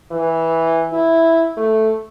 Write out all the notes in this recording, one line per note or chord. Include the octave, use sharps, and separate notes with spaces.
E3
E4
A3